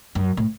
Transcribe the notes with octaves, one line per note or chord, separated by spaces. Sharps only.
F#2
A2